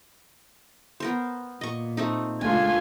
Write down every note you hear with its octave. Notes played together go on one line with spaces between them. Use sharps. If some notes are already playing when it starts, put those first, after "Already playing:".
B3 A#4 C5
A#2 D#5 C#6
A3 C4 D#4
C#2 A3 D4 F4 G#5